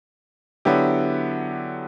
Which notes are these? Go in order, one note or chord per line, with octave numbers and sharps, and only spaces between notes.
D3 F#3 B3 E4 G4